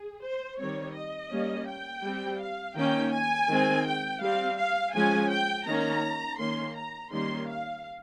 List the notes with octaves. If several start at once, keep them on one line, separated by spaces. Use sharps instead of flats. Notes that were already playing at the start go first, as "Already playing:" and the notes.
Already playing: G#4
C5
D#3 G3 C4 C#5
D#5
G3 A#3 C#4
G5
G3 C4
F5
D#3 A#3 C#4 G5
G#5
D#3 G#3 C4
G5
G3 C4 F5
F5
F3 G#3 C#4 G#5
G5
D#3 A#3 C#4 A#5
D#3 A#3 C#4 C6
A#5
D#3 G3 A#3 C#4 C6
F5